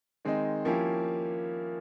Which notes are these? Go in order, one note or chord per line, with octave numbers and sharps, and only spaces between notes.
D#3 G#3 C4 D#4
F3 A#3 C#4 E4 G4